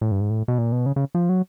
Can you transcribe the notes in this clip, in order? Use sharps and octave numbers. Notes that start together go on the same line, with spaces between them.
A2
G2
G#2
A2
B2
A#2
B2
C#3
C#3
F3
F#3